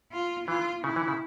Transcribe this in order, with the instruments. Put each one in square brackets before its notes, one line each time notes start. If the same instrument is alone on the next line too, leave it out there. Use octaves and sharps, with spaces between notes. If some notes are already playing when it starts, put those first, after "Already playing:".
[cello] F4
[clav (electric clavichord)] E3 [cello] F4
[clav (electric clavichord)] C#3 [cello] E4
[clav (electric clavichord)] E3
C#3